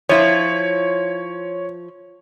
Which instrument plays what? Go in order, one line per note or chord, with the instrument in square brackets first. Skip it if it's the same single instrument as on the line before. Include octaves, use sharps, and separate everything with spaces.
[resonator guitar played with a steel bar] F3 E4 F4 [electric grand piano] C#5